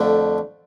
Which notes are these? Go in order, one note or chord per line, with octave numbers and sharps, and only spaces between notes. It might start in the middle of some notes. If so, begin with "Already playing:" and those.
Already playing: F2 D3 A3